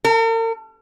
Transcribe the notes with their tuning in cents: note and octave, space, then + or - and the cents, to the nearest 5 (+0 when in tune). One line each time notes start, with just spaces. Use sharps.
A#4 -45